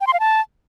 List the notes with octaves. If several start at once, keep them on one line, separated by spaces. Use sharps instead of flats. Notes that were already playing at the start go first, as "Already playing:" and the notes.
G5
C6
F5
A5